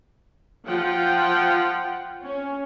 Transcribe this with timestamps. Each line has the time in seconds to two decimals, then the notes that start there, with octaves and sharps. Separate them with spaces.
0.67 F3 F4 F#5 G5
2.22 C#4